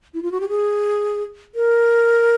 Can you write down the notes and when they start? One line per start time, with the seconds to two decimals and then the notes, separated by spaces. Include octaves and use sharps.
0.14 E4
0.22 F4
0.32 F#4
0.40 G4
0.49 G#4
1.55 A#4